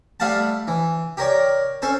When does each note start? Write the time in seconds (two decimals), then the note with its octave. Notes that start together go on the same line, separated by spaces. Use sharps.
0.20 G3 A3 F5 F#5 A5
0.68 E3
1.17 G4 A#4 C#5 D5
1.82 C#4 A4 C5